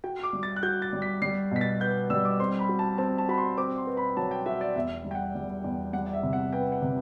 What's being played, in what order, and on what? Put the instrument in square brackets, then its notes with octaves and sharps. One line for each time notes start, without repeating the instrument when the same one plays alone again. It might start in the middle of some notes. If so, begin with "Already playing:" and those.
[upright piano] F#4 [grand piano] G5
[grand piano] D6
[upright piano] G3
[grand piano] A6
F#6
[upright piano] F#4 [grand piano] G6
[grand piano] A6
[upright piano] G3
[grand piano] B6
[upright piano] G3 [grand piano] C7
[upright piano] B2 [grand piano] B6
[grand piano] A6
[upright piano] B3 [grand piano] G6
[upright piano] G3 [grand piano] E6
[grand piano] D6
[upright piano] C4 [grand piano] C6
[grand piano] B5
[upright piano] F#4
[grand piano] A5
[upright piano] C4 [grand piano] A5
[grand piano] A5
[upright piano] F#4 [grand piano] B5
[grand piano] C6
[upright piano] C4 [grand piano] D6
[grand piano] C6
[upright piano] B4
[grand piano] B5
[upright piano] F#3 [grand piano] A5
[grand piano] G5
[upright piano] F#4 [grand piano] E5
[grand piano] D5
[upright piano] E2 [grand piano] E5
[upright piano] G3
[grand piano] G5
F#5
[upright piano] G3
E2
[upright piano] G3 [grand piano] F#5
[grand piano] D5
E5
[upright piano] C3
[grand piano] F#5
[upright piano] B3 [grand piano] G5
[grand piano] F#5
[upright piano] C3